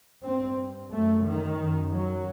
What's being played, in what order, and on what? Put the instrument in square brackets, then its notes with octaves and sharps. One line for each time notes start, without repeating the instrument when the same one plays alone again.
[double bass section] G2 C4
F#2 A3
D#3
F#2
F#3